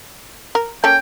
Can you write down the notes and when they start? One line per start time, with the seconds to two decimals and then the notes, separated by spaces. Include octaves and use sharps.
0.55 A#4
0.84 A#3 C#4 A4 G5